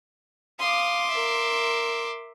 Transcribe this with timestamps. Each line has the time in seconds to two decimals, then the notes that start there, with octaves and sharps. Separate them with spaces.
0.59 F5 C6 D6 D#6
1.10 A#4 E5